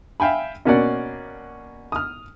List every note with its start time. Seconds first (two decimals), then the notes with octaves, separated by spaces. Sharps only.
0.20 E5 F5 G5 G#5 B5
0.65 B2 A#3 C#4 F#4 D5 F#5
1.92 D#6 F6